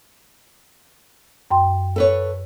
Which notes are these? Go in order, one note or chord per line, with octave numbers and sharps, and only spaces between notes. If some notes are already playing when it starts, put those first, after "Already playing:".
F#2 G5 C6
A4 B4 C#5